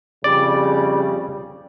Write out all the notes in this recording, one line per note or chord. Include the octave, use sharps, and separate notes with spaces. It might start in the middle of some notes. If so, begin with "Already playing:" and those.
F2 C#3 G3 D5